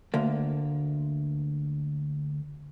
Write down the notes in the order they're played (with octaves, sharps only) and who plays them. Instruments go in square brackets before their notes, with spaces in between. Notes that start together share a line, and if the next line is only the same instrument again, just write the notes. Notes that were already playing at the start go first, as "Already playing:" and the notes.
[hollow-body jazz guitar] D2 A#3